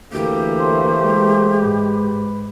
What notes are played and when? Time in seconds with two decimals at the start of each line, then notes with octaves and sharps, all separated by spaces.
0.13 D2 E3 A#3 G4
0.59 A3 C5
1.03 G#3
1.61 G#2 B4